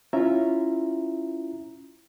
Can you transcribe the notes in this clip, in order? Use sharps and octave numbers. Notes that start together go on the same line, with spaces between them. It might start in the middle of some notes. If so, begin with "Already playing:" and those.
C#4 E4 F4 E5 A#5